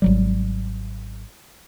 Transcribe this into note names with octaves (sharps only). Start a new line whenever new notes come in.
G#1 F#3 G3